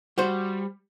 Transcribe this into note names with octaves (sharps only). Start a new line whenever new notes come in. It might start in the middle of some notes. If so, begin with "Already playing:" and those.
G3 F#4 C5